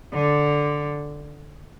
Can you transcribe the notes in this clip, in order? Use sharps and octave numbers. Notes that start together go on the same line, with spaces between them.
D3